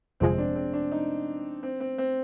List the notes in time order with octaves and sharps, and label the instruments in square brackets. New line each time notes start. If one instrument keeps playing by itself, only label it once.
[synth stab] G1 F2 C3 F3 G#3 [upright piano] C4
[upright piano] D4
C4
D4
D#4
C4
C4
C4